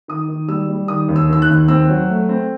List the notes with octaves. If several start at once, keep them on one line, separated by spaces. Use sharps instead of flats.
D#3 D#6
D#3
G3 E6
G3
D#3 D#6
D#2
E6
D#3 E6
F#6
D#2
C4 E6
F#3
A3
C4